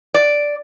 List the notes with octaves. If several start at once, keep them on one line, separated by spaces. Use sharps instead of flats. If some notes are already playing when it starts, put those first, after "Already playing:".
D5